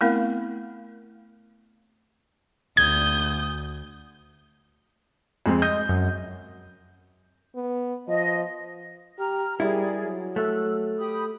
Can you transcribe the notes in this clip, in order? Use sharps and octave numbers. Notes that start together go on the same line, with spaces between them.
A3 B3 C4 E4 A#4 F5
D2 D#6 G6 G#6
F2 G#3 C4
D#5 G6
F#2
B3
F3 D#5
G4 A#5 F6
G3 E4 G#4 A#4 D5
F#3
A3 E6 F#6
G4 B5 D#6